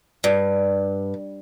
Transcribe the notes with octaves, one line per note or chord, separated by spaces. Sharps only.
G2